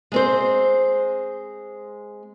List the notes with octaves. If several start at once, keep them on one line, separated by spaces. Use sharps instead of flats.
G#3 C4 C5